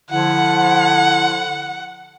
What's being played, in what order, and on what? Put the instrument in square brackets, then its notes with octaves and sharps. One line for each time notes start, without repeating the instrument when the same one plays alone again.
[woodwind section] D3 F3 E4 [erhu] F#5